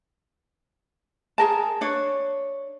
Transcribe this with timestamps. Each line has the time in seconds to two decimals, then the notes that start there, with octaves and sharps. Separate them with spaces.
1.38 G#4 A#4 A5
1.81 D4 C#5